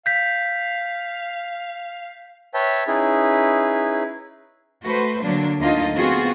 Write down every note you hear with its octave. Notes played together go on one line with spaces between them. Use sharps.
F5 G6 B6
B4 C#5 E5 G5 A5
C#4 D#4 E4 G#4 B4
A3 F#4 B4 C5
D3 F#3 A#3 D4
D2 D3 A#3 D#4 F4 D#5
B3 C4 F4 F#4 G#4